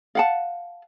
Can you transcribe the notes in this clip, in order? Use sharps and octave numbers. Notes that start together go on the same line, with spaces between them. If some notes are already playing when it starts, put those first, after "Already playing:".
F5 F#5 A5